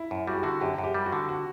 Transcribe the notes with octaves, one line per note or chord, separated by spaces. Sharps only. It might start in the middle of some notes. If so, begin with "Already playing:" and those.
Already playing: E4
F#2
G3 F#4
G4
D3 F#4
F#2 G4
F#2
G4
G3
F#4
D3
F#4